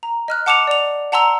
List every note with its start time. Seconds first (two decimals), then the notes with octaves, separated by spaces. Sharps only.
0.03 A#5
0.28 D#5 F6 F#6
0.46 F#5 A5 D6 C#7 E7 F7
0.67 D5 F7
1.12 F#5 A5 A#5 C6 E6 F7